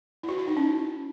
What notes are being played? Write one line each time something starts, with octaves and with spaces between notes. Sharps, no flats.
E4
F#4
E4
D#4
C#4